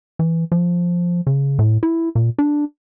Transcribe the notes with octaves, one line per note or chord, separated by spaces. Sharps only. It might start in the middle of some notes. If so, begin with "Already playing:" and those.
E3
F3
C#3
A2
E4
A#2
D4